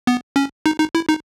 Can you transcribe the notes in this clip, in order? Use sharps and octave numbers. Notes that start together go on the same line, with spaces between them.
B3
C#4
D#4
D#4
E4
D#4